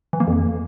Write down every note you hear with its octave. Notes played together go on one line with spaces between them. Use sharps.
E3
A#3
F2